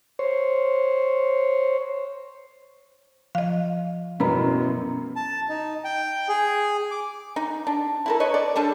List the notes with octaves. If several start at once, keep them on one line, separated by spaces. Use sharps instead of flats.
C5 C#5
F3 D#5 F5
A1 F#2 B2 B4 A#5 B5
A5
D#4
G5
G#4
D6
D#4
D4
E4 A4 A#4
B4 C#5 D#5
D5
G3 D4 G#4 A4